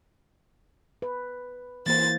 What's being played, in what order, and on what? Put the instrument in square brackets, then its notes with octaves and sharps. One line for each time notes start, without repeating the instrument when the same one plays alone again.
[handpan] B4
[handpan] E3 A#3 C5 [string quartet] A6